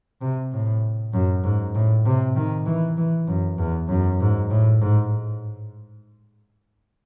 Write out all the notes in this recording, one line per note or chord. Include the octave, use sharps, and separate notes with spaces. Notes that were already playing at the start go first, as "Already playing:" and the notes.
C3
A2
F#2
G#2
A2
C3
D#3
E3
E3
F#2
E2
F#2
G#2
A2
G#2